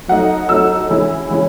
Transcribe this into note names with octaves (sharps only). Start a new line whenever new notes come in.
F#3 A3 D#4 F#5
F#3 A3 D#4 E6
E3 G#3 C#4 E4
E3 G#3 C#4 E4